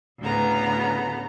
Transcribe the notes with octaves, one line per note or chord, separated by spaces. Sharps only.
D2 A2 C#3 B3 A#5